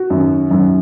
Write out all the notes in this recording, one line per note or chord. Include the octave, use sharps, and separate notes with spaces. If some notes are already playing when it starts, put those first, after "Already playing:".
Already playing: F#4
F#2 D#3 F#3
F#2 D#3 F#3